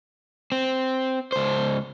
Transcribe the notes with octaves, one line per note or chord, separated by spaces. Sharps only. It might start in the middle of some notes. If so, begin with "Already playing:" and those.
C4
C#2 C5